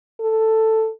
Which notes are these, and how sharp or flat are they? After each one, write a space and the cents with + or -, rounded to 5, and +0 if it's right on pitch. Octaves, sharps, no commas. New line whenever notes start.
A4 +5